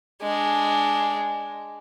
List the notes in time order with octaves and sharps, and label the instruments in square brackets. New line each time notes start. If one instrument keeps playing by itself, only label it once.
[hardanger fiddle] G#3 D4